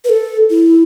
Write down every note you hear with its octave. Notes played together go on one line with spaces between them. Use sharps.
B4
A4
E4